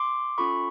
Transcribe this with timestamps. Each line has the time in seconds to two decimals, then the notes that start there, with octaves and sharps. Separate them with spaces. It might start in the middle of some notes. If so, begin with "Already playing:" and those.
Already playing: C6 D6
0.38 C#4 F4 A4 B5 C#6